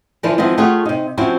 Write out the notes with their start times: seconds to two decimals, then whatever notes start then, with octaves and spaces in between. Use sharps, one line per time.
0.23 D3 E3 F3 D4 E4 B4
0.38 D#3 F3 G#3 B3 C4 E4
0.57 A3 F4 G4 G#4 C#5 F#5
0.85 C3 D#4
1.17 F3 C4 C#4 E4 F#4